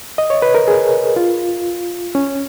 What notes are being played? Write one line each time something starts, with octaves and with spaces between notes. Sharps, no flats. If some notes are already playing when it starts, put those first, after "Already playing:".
D#5
C#5
B4
A#4
G#4
F4
C#4